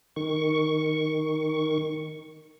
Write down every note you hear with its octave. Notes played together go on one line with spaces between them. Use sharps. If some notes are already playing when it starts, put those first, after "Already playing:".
D#3 C#6